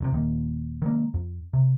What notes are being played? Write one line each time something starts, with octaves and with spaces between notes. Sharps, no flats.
F1 G2 C3
D#1 D#3 A#3
D#3 G#3 A#3
F2
C3